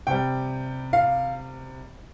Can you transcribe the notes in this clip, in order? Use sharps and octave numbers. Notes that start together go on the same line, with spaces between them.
C3 G3 G5
F5